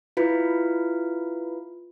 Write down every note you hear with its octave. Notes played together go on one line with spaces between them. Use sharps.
E4 F4 B4